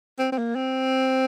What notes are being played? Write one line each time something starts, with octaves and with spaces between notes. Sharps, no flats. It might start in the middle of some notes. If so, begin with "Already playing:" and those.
C4
C4
A#3
C4